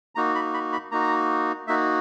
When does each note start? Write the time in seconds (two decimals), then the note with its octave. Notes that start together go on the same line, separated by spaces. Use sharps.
0.15 A#3 D#4 F#4 A#5
0.35 B5
0.54 B5
0.73 B5
0.91 A#3 D#4 F#4 A#5
1.67 A#3 D#4 F#4 E5